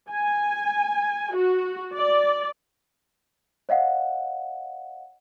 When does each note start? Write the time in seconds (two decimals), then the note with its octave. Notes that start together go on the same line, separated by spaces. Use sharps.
0.10 G#5
1.35 F#4
1.95 D5
3.69 C#5 D#5 F5 F#5